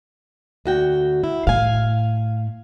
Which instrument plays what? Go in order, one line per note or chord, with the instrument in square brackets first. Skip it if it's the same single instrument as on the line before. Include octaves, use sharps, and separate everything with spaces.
[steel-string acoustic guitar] D2 F#4 G5
E4
[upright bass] A2 [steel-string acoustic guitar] F5 G#5